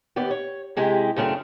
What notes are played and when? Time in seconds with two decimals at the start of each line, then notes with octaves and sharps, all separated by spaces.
0.16 D#2 B3 G4 D5
0.31 C#5
0.77 C3 G#3 E4 G4
1.16 F#2 C#3 A3 C4 D4